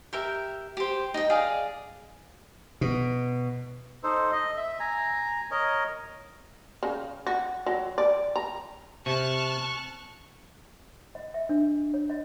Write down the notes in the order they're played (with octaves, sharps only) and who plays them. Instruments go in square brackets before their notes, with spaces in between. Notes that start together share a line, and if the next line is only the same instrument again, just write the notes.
[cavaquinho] G4 A#4 E5
G4 C5
D#4 G5
G#4 D5 F5
[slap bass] B2
[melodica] D#4 A4 C5
D#5
E5
G#5 A#5
A#4 C#5 D#5
[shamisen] C#3
F#4
F#3
D5
A#5
[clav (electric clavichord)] C3 [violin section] A5 F6 F#6 [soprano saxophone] C#6
[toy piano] D#5
E5
D4
C#5
D#5